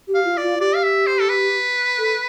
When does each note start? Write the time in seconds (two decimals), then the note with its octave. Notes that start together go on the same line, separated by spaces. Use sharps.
0.08 G4
0.15 F5
0.25 F4
0.37 D5
0.43 F4
0.60 G4 D5
0.75 F5
0.83 E5
1.07 C5
1.20 A4
1.29 B4
1.99 A4